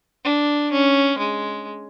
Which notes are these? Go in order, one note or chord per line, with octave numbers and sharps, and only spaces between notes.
D4
C#4
G#3